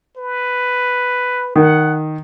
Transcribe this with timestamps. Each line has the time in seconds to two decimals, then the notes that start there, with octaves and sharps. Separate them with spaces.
0.17 B4
1.56 D#3 F#5